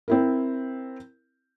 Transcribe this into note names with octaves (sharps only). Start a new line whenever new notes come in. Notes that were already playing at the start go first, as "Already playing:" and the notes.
C4 E4 A#4